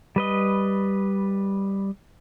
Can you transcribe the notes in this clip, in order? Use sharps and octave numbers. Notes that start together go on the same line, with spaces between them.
G3 B4 D#5